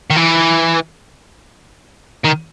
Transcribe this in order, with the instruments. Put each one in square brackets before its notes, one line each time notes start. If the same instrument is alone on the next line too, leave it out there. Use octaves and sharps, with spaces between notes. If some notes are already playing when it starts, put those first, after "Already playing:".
[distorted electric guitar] D#3
E3
D#3